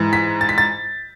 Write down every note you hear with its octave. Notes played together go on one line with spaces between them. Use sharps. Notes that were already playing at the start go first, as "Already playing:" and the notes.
Already playing: G#2 E3
B6
A6
B6
A6